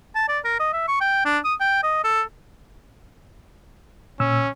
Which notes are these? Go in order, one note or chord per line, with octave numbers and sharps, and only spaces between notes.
A5
D5
A#4
D#5
E5
C#6
G5
D4
D#6
G5
D#5
A4
A#2 C#4 E6